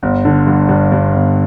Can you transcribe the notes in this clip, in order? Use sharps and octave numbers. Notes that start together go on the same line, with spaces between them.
G1
D3
G2
G2
G2
G1